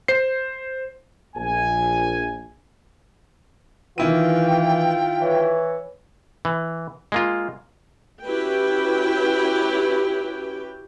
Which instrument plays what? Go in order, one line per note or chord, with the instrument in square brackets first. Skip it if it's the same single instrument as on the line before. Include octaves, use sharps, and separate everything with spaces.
[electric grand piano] C5 C7
[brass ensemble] A#1 G#5
[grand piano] D#3 E4 D#7 [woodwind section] E3 [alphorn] F4 [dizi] G5
[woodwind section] E3 C#5
[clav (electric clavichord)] E3
G#3 A#3 F4
[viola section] C#4 E4 F#4 G4 B4 G5